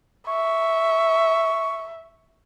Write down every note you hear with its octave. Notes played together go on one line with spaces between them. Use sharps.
E5 C#6